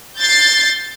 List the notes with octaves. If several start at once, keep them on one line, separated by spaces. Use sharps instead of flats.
G6 A6 C7